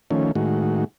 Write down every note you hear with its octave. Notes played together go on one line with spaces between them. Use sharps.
D#3 F3 A3 C#4
A2 D#3 G#3 F#4